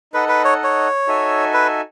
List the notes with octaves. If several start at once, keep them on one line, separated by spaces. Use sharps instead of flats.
D#4 A4 B4 D#5 F#5
B4
C#5
C#5
D#4 F#4 A4 E5 G#5
B4